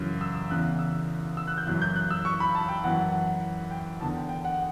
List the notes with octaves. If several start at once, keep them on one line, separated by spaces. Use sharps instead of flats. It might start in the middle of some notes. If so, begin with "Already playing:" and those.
Already playing: F#2 C#3 E3
E6
E6
E2 C#3 E3 F#6
E6
E6
F#6
G6
F#2 E3 F#6
G6
F#6
E6
C#6
B5
A5
G5
F#2 E3 F#5
F#5
G5
E2 D3 A5
G5
G5
F#5